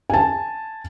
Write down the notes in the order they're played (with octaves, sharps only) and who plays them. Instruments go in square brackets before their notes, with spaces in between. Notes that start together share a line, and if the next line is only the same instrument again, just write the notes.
[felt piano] G#5 A5